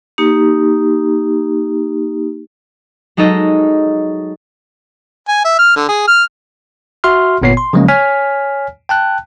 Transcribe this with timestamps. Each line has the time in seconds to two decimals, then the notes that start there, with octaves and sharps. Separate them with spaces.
0.18 A#3 D#4 G4
3.17 F#3 G#3 D#4 G#4 A4 D#5
5.28 G#5
5.44 E5
5.59 F6
5.76 D3
5.89 G#4
6.07 F6
7.04 F#4 E5 C6 F6
7.42 G1 A#2 B3 C#5 C7
7.57 C6
7.73 C#3 F3 F#3 G#3 A#3 C#4
7.88 C#5 G#5 F6 B6
8.89 G5 A5 F#6